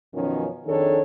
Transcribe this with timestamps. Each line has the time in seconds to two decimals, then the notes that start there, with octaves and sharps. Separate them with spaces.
0.14 F#2 B2 D#3 F3 C#4
0.66 F2 D#3 D4 G#4 A4 C#5